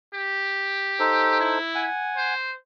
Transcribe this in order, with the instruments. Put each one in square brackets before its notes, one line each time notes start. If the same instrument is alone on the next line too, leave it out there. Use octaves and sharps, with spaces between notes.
[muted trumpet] G4
[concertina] D#4 A4 C5
[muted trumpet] E4
[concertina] F#5 G#5
[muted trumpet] C5